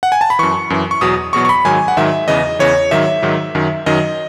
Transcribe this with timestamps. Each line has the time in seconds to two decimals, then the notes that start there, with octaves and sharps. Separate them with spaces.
0.03 F#5
0.12 G#5
0.21 A5
0.30 B5
0.39 F#2 E3 C#6
0.70 F#2 E3
0.91 C#6
1.01 E2 B2 F#3 D#6
1.33 E2 B2 F#3 C#6
1.45 C#6
1.49 B5
1.65 G#2 D#3 F#3 G#5
1.88 F#5
1.97 G#2 D#3 F#3 E5
2.28 E2 C#3 E3 D#5
2.59 E2 C#3 E3 C#5
2.91 G#2 D#3 F#3 E5
3.22 G#2 D#3 F#3
3.55 F#2 D#3 F#3
3.86 F#2 D#3 F#3 D#5